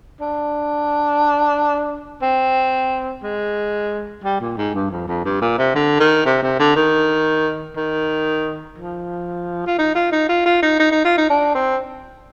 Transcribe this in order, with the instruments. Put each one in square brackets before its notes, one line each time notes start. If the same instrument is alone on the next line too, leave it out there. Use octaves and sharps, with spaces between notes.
[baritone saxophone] D4
C4
G#3
G3
A#2
G#2
G2
F2
F2
G2
A#2
C3
D3
D#3
C3
C3
D3
D#3
D#3
F3
F4
D#4
F4
D#4
F4
F4
D#4
D#4
D#4
F4
D#4
D4
C4